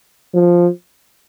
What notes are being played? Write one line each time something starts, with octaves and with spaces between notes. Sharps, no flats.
F3